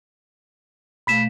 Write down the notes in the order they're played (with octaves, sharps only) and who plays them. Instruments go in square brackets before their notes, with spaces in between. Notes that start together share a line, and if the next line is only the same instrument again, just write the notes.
[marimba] B2 A3 F5 [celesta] B5 B6 E7